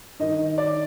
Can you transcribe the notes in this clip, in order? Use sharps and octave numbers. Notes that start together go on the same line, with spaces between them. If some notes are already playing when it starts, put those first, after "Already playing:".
G2 D#3 D#5
D5